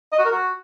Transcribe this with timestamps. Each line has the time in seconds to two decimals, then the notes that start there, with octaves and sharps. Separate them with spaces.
0.12 D#5
0.19 F#4
0.25 A#4
0.32 F#4